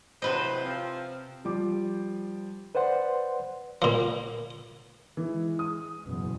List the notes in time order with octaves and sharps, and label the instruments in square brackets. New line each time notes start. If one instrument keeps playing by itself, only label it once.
[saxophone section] A2 F#3 C5 [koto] C3 B4 D#5
[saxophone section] F3 C4
[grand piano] F3 G3 D6
[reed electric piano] B4 C5 D5 F#5 C6
[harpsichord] A#2 F3
[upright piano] E3 [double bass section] G#3
[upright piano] D#6
[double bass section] F#1 E2 B2